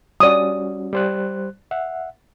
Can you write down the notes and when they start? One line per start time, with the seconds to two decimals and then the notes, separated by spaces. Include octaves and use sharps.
0.20 G3 C#4 F#4 D5 D#6
0.93 G3 C5 F#6
1.71 E5 F#5